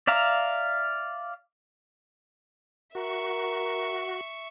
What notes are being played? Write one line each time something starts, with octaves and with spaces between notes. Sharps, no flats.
D5 E5 F5 A#5
F#4 A#4 E5 C#6